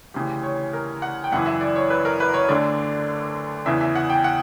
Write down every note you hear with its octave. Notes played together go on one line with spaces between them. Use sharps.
D2 C#3 E3 G4
C#5
A#4
F#5
G5
F#2 C#3 E3 F#5
E5
D5
C#5
B4
A#4
B4
C#5
D2 D3 D5
E2 C#3 E3 E5
E5
F#5
G5
F#5